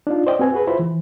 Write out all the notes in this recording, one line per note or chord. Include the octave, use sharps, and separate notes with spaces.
D4 D#4 F4
C5 D5 D#5 G5
C4 F#4 B4 G#5
F#4 G#4 B4
E4 F4 C5 B5
E3